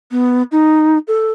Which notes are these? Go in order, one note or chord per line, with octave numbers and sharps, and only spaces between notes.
B3
D#4
A4